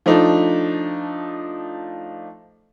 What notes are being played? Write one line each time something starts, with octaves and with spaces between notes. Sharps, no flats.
F3 A3 D4 D#4